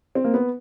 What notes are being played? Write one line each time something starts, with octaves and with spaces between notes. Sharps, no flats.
C4
A#3
B3